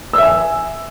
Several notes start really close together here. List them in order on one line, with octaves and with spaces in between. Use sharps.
E6 E5 G#5